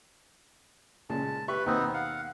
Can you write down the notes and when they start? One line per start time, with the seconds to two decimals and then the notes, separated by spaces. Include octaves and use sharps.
1.10 A#2 C#3 G#3 A5
1.48 G4 B4 E5 B5 C#6
1.66 D#2 B2 B3 C4 D#4
1.94 F5 F#5